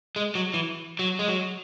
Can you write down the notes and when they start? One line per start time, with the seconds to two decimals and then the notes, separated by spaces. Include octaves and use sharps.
0.16 G#3
0.35 F#3
0.54 E3
0.99 F#3
1.19 G#3
1.28 F#3